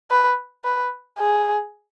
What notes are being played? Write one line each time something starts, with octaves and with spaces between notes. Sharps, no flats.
B4
B4
G#4